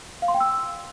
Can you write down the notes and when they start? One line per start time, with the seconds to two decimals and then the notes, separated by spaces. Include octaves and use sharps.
0.22 F5
0.28 C6
0.34 G5
0.40 E6